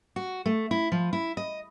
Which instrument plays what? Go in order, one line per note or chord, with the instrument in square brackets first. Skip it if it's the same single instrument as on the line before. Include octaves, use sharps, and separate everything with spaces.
[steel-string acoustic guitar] F#4
A3
E4
F3
E4
D#5